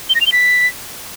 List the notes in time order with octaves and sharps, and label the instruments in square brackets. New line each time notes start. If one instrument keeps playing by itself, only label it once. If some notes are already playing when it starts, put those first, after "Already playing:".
[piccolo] G7
A#6
F7
G7
B6